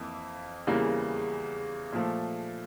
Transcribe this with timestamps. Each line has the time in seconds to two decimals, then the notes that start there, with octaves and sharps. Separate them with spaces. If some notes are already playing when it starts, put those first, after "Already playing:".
Already playing: F2 E3 A#3 E4
0.67 E2 C#3 E3 G3 A#3
1.92 A#2 F3 A3